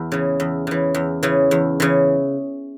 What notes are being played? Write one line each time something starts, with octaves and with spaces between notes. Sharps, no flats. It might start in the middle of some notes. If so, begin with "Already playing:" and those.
Already playing: E2
C#3 E3
E2
C#3 E3
E2
C#3 E3
E2
C#3 E3